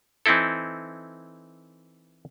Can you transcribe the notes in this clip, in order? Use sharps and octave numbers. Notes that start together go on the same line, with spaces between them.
E3 C4 D#4 E4 A4